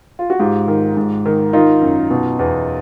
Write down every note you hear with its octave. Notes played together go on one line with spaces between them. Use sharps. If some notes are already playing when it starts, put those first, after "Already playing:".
F4
F#4
G#2 F4 G4
D#3
G#2
D#3
D#3 D#4 F4
F#2
B2
E2